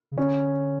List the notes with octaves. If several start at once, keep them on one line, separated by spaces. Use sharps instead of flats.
C#3
D3 C#4